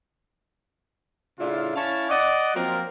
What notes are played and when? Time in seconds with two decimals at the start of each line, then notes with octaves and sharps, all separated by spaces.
1.39 A2 C#3 D4 E4 F4
1.76 C#4 E4 C#5 F5 A5
2.09 D5 D#5 F#5
2.54 F3 F#3 A#3 C4 F4 A#4